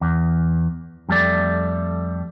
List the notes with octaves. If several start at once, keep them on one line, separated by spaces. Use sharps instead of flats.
E2
F2 G3 A3 D5